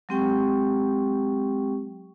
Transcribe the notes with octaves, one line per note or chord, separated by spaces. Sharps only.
F#3 G#3 C4 G4 G5 C#6